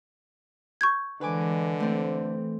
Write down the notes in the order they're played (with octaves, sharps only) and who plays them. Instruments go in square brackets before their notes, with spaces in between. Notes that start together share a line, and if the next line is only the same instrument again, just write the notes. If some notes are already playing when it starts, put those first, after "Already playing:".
[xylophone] C#6 G6 G#6
[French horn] D3 [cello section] E3 G#3 [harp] B4 G#5 D6
[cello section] E3 [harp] A3 C4